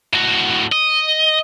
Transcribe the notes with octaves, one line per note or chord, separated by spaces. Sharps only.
A2 F#4
D#5